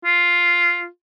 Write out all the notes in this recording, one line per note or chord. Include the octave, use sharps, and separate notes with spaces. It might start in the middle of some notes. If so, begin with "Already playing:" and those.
F4